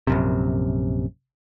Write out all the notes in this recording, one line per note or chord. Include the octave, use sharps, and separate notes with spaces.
A#1 F#2 C3